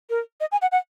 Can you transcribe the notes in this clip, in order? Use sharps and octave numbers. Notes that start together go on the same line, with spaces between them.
A#4
D#5
G#5
F#5
F#5